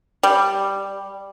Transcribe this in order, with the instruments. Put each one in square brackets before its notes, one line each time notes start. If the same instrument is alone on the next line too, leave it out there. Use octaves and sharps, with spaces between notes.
[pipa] G3